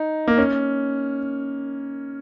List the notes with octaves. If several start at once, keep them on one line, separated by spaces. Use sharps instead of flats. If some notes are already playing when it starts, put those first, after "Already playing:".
Already playing: D#4
A#3
C#4